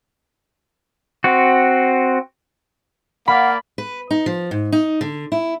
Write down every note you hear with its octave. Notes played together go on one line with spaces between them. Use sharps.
C4 F#4
A#3 D5 F5 F#5 B5
B4
D#4
F3
G#2
D#4
D3
E4